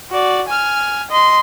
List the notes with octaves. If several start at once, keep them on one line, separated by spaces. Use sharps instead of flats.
F#4 D5
G#5 F6
D#5 C6